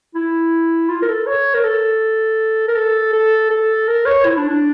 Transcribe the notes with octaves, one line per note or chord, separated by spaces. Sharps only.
E4
F4
A#4
A4
C#5
A#4
A4
A#4
A4
A4
A4
A#4
C#5
E4
D4
D4